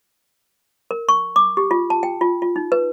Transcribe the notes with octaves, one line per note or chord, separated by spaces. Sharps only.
A#4
C#6
D6
G4
F4
A5
G5
F4
F4
D#4
B4